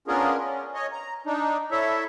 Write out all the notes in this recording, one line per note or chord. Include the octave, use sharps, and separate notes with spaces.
B3 C#4 D4 F4 G#4 A#4
C#4
C#5 D#5
A#5
D4 D#4
E4 A4 C#5 E5